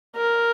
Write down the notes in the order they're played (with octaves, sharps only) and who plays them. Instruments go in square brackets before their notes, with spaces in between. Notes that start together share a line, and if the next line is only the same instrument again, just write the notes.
[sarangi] A#4